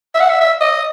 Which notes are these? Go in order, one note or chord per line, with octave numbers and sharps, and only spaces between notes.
E5
F#5
E5
E5
D#5